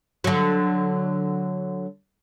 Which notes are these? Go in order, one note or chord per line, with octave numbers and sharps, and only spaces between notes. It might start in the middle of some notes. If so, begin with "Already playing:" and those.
D3 F#3